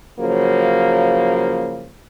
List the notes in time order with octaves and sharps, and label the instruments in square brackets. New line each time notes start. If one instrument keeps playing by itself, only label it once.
[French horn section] C#3 F3 F#3 A#3